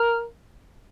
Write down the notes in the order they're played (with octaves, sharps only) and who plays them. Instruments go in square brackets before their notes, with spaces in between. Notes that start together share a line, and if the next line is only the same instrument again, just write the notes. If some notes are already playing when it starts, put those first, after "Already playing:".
Already playing: [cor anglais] A#4